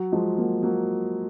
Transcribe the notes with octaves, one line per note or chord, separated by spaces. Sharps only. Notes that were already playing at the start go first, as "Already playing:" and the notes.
Already playing: F#3
F3 G#3
F#3 A#3
F#3 A#3